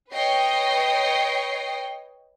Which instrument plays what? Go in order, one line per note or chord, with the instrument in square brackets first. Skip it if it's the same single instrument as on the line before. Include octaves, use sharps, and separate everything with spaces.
[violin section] B4 C#5 D#5 G5 C7